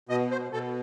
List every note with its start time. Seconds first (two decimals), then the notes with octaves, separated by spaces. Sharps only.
0.09 B2 D#5
0.31 C5
0.52 B2 A4